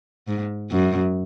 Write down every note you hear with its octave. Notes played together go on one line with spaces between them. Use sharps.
G#2
F#2